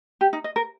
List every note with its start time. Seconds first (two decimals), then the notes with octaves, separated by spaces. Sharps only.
0.21 G4
0.33 D#4
0.44 D#5
0.56 A#4